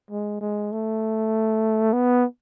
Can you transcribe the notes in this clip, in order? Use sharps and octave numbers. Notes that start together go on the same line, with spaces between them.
G#3
G#3
A3
B3